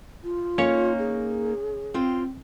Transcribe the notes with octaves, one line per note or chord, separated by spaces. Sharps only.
F4
A#3 C#4 D#4 C#5
G#4
C4 F4 G5